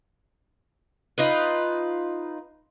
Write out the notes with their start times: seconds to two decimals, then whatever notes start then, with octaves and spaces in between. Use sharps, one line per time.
1.18 D#4 F4 B4